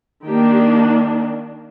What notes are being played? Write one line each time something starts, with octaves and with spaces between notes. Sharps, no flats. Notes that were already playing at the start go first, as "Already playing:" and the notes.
D#3 A#3 D4 G4